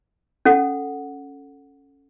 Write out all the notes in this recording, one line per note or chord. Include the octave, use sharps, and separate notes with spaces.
C#4 A4 F#5